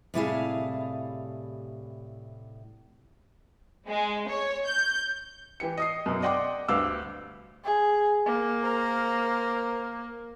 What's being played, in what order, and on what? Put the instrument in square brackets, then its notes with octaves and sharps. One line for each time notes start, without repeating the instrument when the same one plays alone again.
[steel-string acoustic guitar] A2 C3 G3 E4 G#4 F5
[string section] G#3
C#5
G6
[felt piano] E3 G4 C#7
D#5 D#6 C7
F#2 B2
D5 D#5 F#5 G5 C6 D6
D2 G2 F5 D6 E6
[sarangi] G#4
A#3
[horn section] A#4 C5 A#5